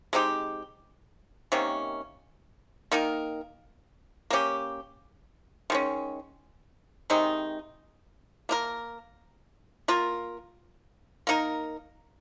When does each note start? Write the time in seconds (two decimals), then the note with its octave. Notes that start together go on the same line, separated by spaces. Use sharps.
0.13 G#3 C4 D#4 G4
1.52 C3 D#3 A#3 C#4
2.92 D#3 A#3 D#4 A#4
4.30 A#3 C#4 G4
5.70 D#3 G#3 C#4
7.10 C3 D#3 G#3 D#4
8.49 A#3 D#4 A#4
9.88 A#3 F4 A#4
11.27 A#3 D#4 A#4